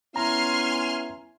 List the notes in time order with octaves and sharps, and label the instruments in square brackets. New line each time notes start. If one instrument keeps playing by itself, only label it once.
[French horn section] B3 C#4 E4 [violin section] G#5 C6 F6 [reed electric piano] A#5